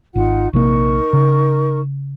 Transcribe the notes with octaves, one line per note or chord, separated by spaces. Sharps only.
G#1 D#4 F4 F#5
A#1 C3 A#3 D#4 A#4 C#6
C#3